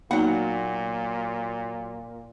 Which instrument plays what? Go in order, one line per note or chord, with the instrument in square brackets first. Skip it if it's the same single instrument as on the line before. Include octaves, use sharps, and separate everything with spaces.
[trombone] A#2 [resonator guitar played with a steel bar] F#3 F#5 [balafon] A#3 B3 D#4